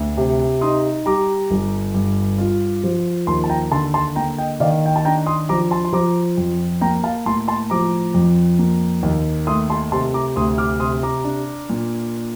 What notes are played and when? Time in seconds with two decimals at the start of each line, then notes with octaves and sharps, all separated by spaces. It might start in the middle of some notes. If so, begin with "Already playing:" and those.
Already playing: D2
0.17 C3
0.61 D#4 C6 D#6
1.06 G3 A#5 D6
1.51 G1
1.94 G2
2.38 F4
2.84 F3
3.27 D#2 A5 C6
3.44 A5
3.50 G5 A#5
3.72 D3 A5 C6
3.94 A5 C6
4.16 A#3 G5 A#5
4.38 D#5 G5
4.60 D#3 D5 F5
4.86 G5
4.96 A5
5.05 D4 G5 A#5
5.26 C6 D#6
5.49 F3 A#5 D6
5.71 A5 C6
5.85 C6
5.93 F3 A#5 D6
6.37 F2
6.81 A#3 G5 A#5
7.04 F5 A5
7.26 A2 A5 C6
7.48 A5 C6
7.70 F3 A#5 D6
8.14 F2
8.59 A#3
9.03 D#2
9.47 A3 C6 D#6
9.70 A5 C6
9.92 C3 A5 C6
10.14 A#5 D6
10.36 D2 C6 D#6
10.58 D6 F6
10.80 C3 C6 D#6
11.03 A#5 D6
11.24 D4
11.70 A#2